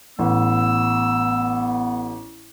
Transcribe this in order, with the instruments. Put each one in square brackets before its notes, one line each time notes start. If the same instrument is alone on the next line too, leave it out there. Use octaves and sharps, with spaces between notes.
[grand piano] A1 [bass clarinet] B3 [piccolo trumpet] E6